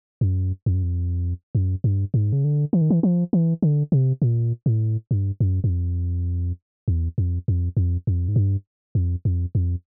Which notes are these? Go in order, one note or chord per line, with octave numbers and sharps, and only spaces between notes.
F#2
F2
F#2
F2
F#2
G2
G#2
C#3
D3
E3
D#3
E3
F3
E3
D3
C3
A#2
A2
G2
F#2
F#2
F2
E2
F2
F2
F2
F2
G#2
G2
F2
F2
F2